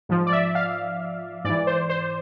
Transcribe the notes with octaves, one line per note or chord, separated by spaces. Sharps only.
G#2 F3
D5
E5
F5
G#2 E3 D5
C5
C5